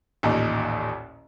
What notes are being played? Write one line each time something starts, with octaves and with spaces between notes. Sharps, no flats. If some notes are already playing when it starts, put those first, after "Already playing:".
A1 D#2 A#2 D#4